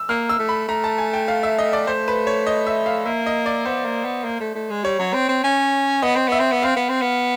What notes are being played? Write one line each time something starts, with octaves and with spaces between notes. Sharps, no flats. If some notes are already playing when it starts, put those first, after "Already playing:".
Already playing: E6
A#3 F6
E6
A3
B5
A3 A#5
A5
G#5
G5
F5
E5
D#5
D5
A3 C5
B4
C#5
D#5
E5
F5
A#3 E5
D#5
D5
B3 C5
A#3
B3
A#3
A3
A3
G#3
G3 C#5
F#3
C4
C4
C#4
B3 D#5
C4
B3 E5
C4
B3
C4 F5
B3
C4
B3